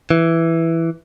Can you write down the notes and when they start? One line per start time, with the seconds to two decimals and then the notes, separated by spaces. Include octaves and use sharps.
0.11 E3